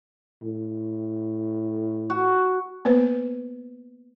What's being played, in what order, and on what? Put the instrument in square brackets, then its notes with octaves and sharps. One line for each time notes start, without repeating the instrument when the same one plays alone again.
[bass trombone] A2
[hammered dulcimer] F#4
[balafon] A#3 B3 B4 C5